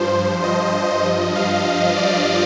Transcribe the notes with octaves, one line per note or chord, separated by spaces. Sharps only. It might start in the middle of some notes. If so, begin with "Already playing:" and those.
Already playing: G2 F3 C5
D#5
G2 F3
F5
D#5
D5